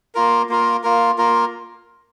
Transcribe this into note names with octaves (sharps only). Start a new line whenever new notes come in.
A#3 F4 A#4
A#3 F4 A#4
A#3 F4 A#4
A#3 F4 A#4